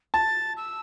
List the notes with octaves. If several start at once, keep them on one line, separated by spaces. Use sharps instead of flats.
A5 A6
E6